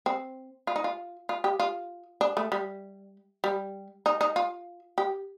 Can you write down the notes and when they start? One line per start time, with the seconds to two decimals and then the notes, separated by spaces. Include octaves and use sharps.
0.06 C4
0.67 F4
0.76 D#4
0.84 F4
1.29 F4
1.44 G4
1.60 F4
2.21 D4
2.37 A3
2.52 G3
3.44 G3
4.06 D#4
4.21 D#4
4.36 F4
4.98 G4